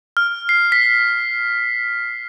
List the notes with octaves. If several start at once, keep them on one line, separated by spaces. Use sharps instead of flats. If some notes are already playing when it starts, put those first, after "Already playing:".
F6
C7
B6